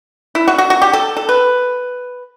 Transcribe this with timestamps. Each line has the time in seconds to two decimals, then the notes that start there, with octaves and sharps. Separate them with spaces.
0.35 E4
0.48 F#4
0.58 F#4
0.70 F#4
0.82 G4
0.93 A4
1.17 A4
1.29 B4